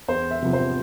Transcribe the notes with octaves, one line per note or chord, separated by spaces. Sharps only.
E2 C5
E5
C3 F3 B3
C5